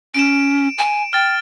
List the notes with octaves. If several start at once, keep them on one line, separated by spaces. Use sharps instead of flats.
C#4 D7 E7
G#5
G5 F6 A6